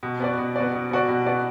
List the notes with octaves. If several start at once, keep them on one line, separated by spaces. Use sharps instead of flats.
B2
B3 F#4 D5
B2
B3 F#4 D5
B2
B3 F#4 D5
B2
B3 F#4 D5